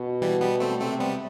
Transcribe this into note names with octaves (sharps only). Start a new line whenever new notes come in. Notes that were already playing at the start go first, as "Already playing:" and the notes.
Already playing: B2
E3 G3
G3 B3
A3 C4
C3 A3 C4
G3 B3